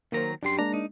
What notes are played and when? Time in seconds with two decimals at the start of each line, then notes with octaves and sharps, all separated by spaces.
0.12 D#3 F#3 A#3 A#4 C5 A#5
0.43 F#2 G3 D4 G4 C6
0.59 G#3 A#3 D4 A#5
0.74 D#4